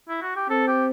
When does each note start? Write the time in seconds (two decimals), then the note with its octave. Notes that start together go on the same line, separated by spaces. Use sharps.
0.09 E4
0.22 F#4
0.36 G4
0.50 C4 A4
0.67 G4